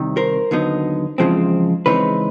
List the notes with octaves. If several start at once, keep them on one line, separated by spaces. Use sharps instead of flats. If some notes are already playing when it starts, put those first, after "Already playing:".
Already playing: C2 C3 D#3
A#4 C5
D#2 D3 F#3 B3 D#4
E2 C#3 F3 G#3 C4
C#3 E3 G#3 C4 D#4 B4 C#5